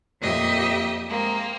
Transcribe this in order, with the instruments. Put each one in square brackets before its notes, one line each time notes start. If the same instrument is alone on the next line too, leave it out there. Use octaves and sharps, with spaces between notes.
[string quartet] F2 A#2 G4 D#5 E5
G#3 A#3 C4